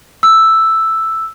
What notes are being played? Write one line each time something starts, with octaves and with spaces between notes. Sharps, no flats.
E6